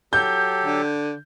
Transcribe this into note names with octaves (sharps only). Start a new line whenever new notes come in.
F#3 G4 A4 G6
D3